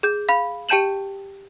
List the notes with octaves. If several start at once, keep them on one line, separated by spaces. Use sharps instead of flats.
G#4 G6
F5 B5
G4 G5 A5 G6 E7 F#7